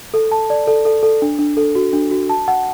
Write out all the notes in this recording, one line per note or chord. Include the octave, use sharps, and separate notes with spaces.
A4
A5
D5
A4
A4
A4
D4
D4
A4
F#4
D4
F#4
A5
F#5